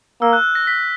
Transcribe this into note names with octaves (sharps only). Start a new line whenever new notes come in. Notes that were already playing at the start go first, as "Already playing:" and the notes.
A#3 E6
F#6
A#6
B6